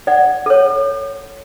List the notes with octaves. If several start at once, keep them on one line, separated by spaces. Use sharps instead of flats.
D5 F#5
A4 C#5